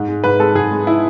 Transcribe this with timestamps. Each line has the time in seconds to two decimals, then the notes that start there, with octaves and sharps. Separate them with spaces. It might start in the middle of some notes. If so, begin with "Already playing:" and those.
Already playing: G#2
0.08 G#3
0.24 G#2 B4
0.40 G#3 A4
0.55 G#2 G#4
0.72 G#3
0.87 E4